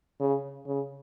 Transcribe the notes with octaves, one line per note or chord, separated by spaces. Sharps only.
C#3
C#3